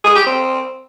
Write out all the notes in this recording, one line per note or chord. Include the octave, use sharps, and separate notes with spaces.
G#4
G4
C4